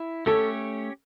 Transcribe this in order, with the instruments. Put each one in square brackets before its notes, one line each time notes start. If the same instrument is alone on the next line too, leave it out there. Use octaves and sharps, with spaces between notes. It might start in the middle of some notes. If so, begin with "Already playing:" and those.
Already playing: [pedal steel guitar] E4
[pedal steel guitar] A3 C#4 G4 C#5 [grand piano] A4